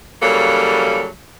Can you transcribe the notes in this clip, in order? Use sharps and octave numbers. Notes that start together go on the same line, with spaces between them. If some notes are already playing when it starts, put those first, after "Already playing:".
C#3 E3 F#3 G3 A#3 A4